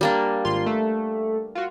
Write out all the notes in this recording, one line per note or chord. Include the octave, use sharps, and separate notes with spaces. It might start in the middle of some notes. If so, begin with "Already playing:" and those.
G3 A#3 D4
G#1 F4 C6
A3
F4 F#4